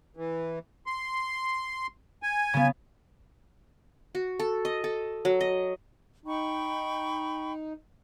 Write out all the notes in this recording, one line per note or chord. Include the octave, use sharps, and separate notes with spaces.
E3
C6
G#5
C#3 B3
F#4
A4
D#5
A4
F#3
D#5
D#4 G5 B5 C#6